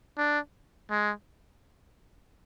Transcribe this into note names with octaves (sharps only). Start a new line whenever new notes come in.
D4
G#3